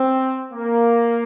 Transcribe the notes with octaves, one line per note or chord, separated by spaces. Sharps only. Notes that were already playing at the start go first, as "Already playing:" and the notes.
Already playing: C4
A#3